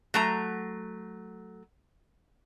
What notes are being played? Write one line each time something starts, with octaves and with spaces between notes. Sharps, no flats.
F#3 A3 A#5